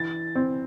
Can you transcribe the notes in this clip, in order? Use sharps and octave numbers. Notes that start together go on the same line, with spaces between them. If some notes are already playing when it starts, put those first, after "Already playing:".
Already playing: E3 A6
C4